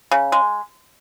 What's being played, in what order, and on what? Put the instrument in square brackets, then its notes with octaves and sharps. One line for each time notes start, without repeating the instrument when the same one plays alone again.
[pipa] C#3
G#3